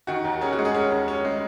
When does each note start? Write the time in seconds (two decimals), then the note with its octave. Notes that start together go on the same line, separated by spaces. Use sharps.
0.07 D#3 F#4
0.24 D#2
0.41 C#4 G#4
0.53 F#4
0.59 G#3
0.65 G#4
0.74 C#4
0.91 D#2
1.08 C#4
1.25 G#3